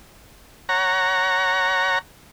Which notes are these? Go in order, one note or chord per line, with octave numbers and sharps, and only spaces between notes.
C#5 F#5 A#5